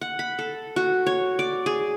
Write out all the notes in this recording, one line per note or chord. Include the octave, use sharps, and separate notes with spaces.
F#5
B5
A4
F#4
C#5
D5
G#4